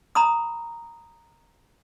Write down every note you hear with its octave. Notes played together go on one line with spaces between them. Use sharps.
A#5 B5 D#6